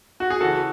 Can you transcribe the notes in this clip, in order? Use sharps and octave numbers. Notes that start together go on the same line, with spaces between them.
F#4
G#4
C#3 E3 F#4 A4